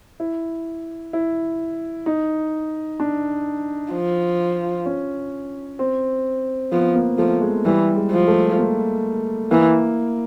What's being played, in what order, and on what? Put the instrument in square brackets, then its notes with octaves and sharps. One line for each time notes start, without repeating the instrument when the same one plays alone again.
[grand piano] E4
E4
D#4
D4
[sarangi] F3
[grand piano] C#4
C4
[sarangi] F3 [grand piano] B3
[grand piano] A#3
[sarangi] F3 [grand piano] A3
[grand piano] G#3
[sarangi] E3 [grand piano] G3
[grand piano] G#3
[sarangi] F3
[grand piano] A3
A#3
[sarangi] E3 [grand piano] A#3